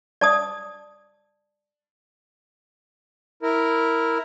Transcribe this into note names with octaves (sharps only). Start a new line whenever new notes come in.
D5 A5 D#6
E4 A#4